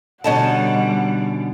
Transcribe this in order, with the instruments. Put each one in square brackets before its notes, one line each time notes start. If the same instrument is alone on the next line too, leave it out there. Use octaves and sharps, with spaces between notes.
[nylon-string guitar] B2 D3 [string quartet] G3 [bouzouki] C#4 D#4 A5 [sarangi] F#5